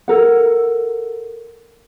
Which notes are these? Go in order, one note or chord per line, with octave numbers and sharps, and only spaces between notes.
A4 A#4 F#5